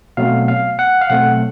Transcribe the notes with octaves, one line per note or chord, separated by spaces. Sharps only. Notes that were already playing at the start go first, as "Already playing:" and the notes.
B2 F#3 A3 C4 F5
F5
F#5
F5
B2 F#3 A3 C4 F#5